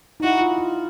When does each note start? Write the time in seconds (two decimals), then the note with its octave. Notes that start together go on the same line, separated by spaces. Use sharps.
0.20 D#4
0.23 E4 F#4
0.41 F4
0.58 F4